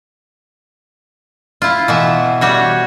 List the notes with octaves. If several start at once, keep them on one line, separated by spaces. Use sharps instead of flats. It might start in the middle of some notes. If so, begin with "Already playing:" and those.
E4 F4
B2 E3 E5
G3 F#4 C#5